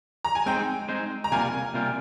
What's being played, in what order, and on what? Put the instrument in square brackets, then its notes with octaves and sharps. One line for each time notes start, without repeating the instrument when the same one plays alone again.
[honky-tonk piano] A#5
G#5
[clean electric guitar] G#3 C4 D#4 G#4 C5 [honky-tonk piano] G5
[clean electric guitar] G#3 C4 D#4 G#4 C5
[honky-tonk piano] A#5
[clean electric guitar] C3 G3 A#3 F4 A#4 [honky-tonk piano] G#5
[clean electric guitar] C3 G3 A#3 F4 A#4